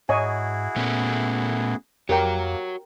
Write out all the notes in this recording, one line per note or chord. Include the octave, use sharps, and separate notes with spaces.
G#2 E4 F#4 G#4 C#5 D#5 G#5
A#2 A3 B3 C#4
F2 A#3 F#4 G4 A#4 C#5 G5